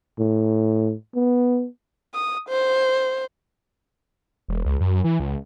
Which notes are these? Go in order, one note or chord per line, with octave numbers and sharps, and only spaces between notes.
A2
B3
D#6
C5
E1
C#2
F#2
E3
C#2